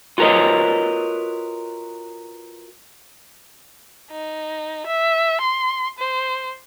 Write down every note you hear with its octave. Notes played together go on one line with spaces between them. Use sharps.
F4 F#4 A#4 B4 C#5 D#5
D#4
E5
C6
C5